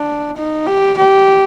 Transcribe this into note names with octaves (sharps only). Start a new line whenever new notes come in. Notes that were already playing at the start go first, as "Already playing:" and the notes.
Already playing: D4
D#4
G4
G4